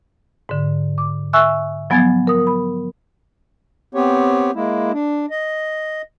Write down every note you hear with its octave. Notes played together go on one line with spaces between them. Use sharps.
G#2 D3
D6
E5 G#5 C#6 E6 F#6
F3 F#3 B3 G#5 G#6 A6
A#4 D#6
B5
B3 C4 G4 C#5
G#3 A#3 E4
D4
D#5